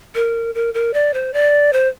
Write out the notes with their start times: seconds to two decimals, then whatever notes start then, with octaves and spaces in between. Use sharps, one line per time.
0.15 A#4
0.55 A#4
0.74 A#4
0.94 D5
1.14 C5
1.34 D5
1.73 C5